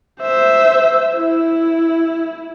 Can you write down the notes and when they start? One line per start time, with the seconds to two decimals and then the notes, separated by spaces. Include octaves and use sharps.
0.21 C5 E5
1.17 E4